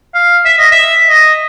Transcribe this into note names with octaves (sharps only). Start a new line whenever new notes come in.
F5
E5
D#5
E5
D#5